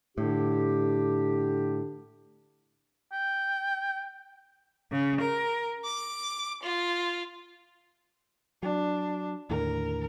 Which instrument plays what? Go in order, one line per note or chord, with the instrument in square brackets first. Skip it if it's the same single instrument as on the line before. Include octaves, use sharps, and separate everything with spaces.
[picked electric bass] A2 [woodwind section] D3 D4 G4
[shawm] G5
[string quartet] C#3
A#4
D6
F4
[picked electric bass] F#3 [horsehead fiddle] D4
[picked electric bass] D#2 A2 D3 [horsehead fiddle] A#4